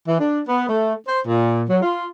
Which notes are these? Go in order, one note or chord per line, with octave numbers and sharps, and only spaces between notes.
E3
D4
B3
A3
C5
A#2
F#3
F4